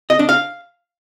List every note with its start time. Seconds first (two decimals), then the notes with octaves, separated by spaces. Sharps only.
0.10 D#5
0.19 D4
0.29 F5